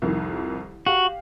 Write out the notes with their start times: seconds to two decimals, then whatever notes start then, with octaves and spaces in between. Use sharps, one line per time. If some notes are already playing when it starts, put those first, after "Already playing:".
0.02 C2 F2 D#3
0.86 F#4 G4 F5